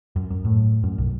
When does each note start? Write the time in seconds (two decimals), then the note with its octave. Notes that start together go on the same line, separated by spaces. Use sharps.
0.16 F#2
0.30 F#2
0.45 A2
0.83 F#2
0.98 B1